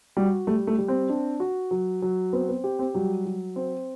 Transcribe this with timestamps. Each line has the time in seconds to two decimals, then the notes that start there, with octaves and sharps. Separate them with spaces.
0.17 G3 F#4
0.47 G3 A3
0.67 A3
0.78 G3
0.88 C4
1.09 D4
1.40 F#4
1.71 F#3
2.02 F#3
2.33 B3 C4
2.48 B3
2.64 G4
2.79 C4
2.94 F#3 G3
3.25 F#3
3.56 C4